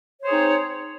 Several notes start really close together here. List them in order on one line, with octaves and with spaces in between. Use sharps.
C#5 C5 G#4 D#4 C4